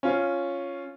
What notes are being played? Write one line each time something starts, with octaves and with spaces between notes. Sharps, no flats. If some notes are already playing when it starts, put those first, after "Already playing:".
C#4 F4